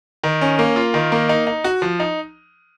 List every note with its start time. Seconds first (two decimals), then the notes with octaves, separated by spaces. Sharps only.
0.24 D#3
0.41 C#4
0.59 A#3
0.76 F4
0.94 D#3
1.12 A#3
1.29 D#4
1.47 D#4
1.64 F#4
1.82 F3
2.00 D#4